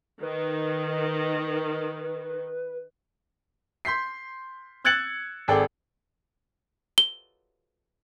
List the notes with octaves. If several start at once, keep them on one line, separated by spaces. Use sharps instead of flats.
D#3 B4
C6 G6 B6 C7
E6 F#6 G#6 A6 C#7 F#7
G#1 G#4 A4 D5 G5
G7